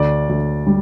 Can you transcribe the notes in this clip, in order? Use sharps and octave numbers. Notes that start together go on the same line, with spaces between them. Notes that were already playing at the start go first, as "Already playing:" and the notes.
Already playing: D2 D5
D2
G3